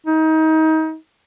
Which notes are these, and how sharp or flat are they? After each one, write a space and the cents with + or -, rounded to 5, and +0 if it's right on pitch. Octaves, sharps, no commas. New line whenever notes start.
D#4 +30